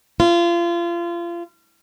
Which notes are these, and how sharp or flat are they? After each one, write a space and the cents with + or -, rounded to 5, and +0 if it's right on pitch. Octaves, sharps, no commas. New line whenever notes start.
F4 -30